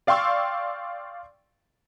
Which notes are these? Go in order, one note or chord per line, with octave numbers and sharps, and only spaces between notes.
D5 F5 G5 C6 C#6 E6